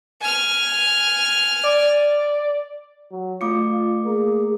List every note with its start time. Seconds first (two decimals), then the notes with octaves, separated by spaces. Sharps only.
0.21 G#5 F6
1.64 D5
3.12 F#3
3.41 A3 F4 D6 C#7
3.71 F4
4.05 A#3 G#4